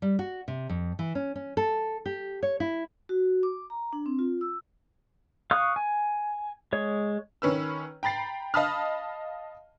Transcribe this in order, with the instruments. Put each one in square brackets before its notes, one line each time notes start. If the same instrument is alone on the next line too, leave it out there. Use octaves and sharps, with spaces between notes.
[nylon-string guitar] G3
F#4
C3
F2
E3
C#4
C#4
A4
G4
C#5
E4
[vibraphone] F#4
D6
A#5
D4
C4
F4
E6
[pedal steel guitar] F5 C#6 D#6 F6 F#6
G#5
G#3 C#5
[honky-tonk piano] D#3 C#4 B4 E6
G5 A#5 B5 A6 C7
D#5 F5 A5 B5 D#6 F6